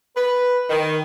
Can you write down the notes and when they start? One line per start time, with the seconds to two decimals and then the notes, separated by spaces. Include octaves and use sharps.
0.16 B4
0.70 D#3